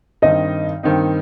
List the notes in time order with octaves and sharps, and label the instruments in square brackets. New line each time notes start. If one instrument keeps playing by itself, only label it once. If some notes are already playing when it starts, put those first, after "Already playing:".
[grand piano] G2 D#3 C4 D#4 [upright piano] D#5
[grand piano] G2 D#3 C4 D#4